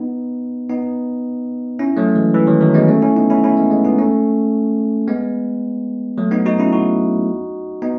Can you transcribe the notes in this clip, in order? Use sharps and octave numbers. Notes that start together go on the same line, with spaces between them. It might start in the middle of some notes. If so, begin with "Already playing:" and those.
Already playing: B3 D#4
B3 D#4
C#4 E4
F#3 A3
E3 G#3
E3
D#3 F#3
D#3 F#3
G#3 B3
A3 C#4
C#4 E4
B3 D#4
C#4 E4
C#4 E4
G#3 B3
G#3 B3
B3 D#4
A3 C#4
G#3 B3
F#3 A3
B3 D#4
D#4 F#4
C#4 E4
D#4 F#4
B3 D#4